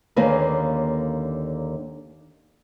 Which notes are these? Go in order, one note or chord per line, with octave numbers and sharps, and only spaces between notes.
D#2 D3 A#3 C#4 A#4 B4